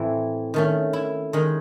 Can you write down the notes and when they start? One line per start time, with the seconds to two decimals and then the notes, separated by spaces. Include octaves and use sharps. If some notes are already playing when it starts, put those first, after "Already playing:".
Already playing: A2 E3 C4 E4
0.54 D#3 A3 C#4
0.93 E4
1.33 D#3 G#3 D#4